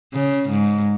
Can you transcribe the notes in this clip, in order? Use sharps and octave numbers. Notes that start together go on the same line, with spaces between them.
C#3
G#2